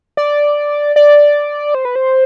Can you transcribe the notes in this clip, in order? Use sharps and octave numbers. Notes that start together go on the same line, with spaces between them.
D5
D5
C5
B4
C5